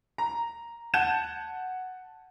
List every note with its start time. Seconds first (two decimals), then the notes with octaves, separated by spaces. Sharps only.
0.18 A#5
0.94 F#5 A5 G6 G#6 E7